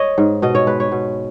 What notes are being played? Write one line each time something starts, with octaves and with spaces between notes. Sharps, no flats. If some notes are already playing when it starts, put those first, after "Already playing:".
Already playing: C#5 D#5
G#2
B2 D#5
C#5
G#3 B4
C#5
B2